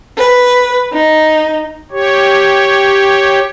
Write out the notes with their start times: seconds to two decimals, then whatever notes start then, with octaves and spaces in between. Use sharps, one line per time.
0.17 B4
0.92 D#4
1.92 G4 C#5